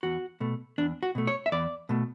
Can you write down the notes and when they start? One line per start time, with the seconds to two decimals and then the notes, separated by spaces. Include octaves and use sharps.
0.03 E2 F#4
0.40 B2 A3
0.78 E2 D4
1.03 F#4
1.15 B2 A3
1.27 C#5
1.46 E5
1.52 E2 D5
1.89 B2 A3